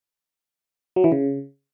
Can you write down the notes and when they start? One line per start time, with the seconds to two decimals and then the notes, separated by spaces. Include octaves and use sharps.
0.96 F#3
1.04 E3
1.12 C#3